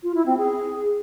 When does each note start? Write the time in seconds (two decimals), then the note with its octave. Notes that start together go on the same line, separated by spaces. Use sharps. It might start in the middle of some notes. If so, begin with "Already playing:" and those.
0.03 F4
0.14 E4
0.26 C4
0.37 G#4